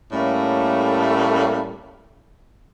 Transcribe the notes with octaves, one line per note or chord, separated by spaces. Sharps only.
A2 G3 A3 A#3 C#4 A4